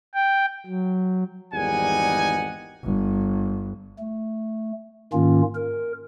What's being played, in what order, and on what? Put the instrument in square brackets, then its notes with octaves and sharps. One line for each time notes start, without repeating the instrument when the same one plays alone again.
[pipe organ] G5
F#3
[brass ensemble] G#1 E2 G3 D#4 F#5 G#5
[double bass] G1
[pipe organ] A3
G#2 D#3 A#3 C#4 F4
A#4